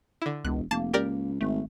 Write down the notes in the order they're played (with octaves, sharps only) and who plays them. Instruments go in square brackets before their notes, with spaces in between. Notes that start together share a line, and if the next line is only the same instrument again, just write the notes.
[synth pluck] D3 E4
[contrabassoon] E1 [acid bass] C#2 [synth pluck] F#6
[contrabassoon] F1 [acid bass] A#3 [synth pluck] A5
[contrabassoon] C#2 [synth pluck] G4 A#4 D5
[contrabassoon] G#1 [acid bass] A3